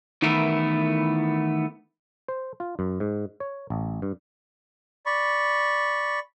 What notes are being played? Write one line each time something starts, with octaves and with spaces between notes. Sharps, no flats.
D#3 E3 A3 B3 E4 A#4
C5
F4
F#2
G#2
C#5
A1
G2
D5 B5 C#6